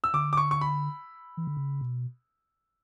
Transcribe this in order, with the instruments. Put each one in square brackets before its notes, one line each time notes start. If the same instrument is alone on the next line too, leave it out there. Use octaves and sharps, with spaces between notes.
[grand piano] E6
[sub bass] D3 [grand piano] D6
[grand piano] D6
C#6
C#6
B5
[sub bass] E3
D3
C#3
B2